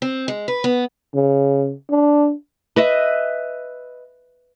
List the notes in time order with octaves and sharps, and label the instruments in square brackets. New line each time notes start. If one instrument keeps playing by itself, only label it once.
[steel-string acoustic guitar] C4
G#3
B4
B3
[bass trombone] C#3
D4
[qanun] B4 D#5 E5